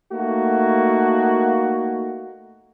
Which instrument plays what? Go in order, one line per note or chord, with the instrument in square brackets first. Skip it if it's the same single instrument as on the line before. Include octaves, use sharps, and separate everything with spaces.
[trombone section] A3 A#3 D#4 F#4